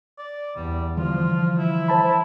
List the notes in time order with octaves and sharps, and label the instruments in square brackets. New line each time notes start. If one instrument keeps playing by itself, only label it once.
[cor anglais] D5
[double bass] E2 [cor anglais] G3
[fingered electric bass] D3 E3 G3 [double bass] F3 [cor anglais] F4
[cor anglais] E4
[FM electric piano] C5 A5 B5